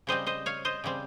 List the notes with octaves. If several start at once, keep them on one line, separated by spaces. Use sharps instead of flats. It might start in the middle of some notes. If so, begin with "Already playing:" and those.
C#3 G3 C4 C5 D#5
C5 D#5
C#5 F5
C5 D#5
C#3 G3 C4